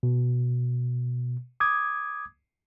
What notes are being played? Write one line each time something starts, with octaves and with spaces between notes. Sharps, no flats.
B2
D6 D#6 G#6